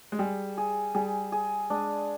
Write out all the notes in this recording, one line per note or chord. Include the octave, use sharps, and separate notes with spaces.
G#3
G3 G#4
G#4
G3 G#4
G#4
G#3 D4